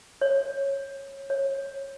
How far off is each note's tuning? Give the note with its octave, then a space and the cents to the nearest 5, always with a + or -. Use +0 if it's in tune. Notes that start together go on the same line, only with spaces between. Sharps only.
C#5 -15
C#5 -20